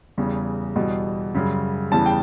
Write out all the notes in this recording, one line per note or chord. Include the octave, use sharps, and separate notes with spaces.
E2 C#3 G3
E2 B2 G3
F#2 C#3 G3
E2 C#3 E3 G3 A5
G5